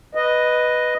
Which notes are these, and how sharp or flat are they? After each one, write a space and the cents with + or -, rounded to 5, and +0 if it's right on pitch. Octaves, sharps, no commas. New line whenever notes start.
B4 +0 D#5 +0